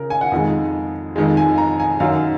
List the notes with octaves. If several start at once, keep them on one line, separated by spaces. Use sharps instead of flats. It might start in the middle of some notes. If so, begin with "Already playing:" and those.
Already playing: C#3 A#4 A#5
G#5
F#5
F2 D#3 G#3 G#5
F2 D#3 G#3
G#5
A#5
G#5
F#2 D#3 F#3 F5